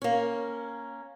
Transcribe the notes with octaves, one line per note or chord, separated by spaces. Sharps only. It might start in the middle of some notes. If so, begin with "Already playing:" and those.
A#3 C#4